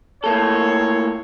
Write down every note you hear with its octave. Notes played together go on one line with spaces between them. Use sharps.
A2 A#3 A4 C#5